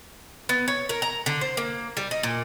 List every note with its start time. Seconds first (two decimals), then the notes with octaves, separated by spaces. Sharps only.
0.49 B3
0.68 C#5
0.89 A#4
1.02 A#5
1.26 D3
1.41 C5
1.57 A#3
1.97 G3
2.11 D#4
2.23 A#2